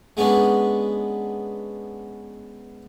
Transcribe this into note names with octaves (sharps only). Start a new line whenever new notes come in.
G#3 B3 C#4 D4